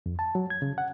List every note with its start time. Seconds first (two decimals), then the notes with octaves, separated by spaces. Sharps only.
0.06 F2
0.19 A5
0.35 F#3
0.50 G#6
0.62 C#3
0.78 F#5